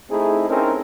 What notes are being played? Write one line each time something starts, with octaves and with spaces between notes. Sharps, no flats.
A3 C4 D#4 E4 G#4
C4 C#4 D#4 E4 A4 A#4